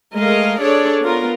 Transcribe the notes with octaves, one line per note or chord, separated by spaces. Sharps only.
G#3 A3 A#4 D#5 F5
D4 G#4 A4 C#5 D5
B3 F4 A#4